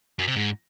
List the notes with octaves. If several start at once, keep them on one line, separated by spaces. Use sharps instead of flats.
F#2
C3
G#2